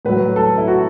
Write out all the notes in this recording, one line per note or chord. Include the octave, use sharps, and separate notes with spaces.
A2 F#3 B4
A4
E4
F#4